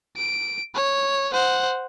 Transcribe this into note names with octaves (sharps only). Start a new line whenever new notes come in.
D7
C#5
C5 F#5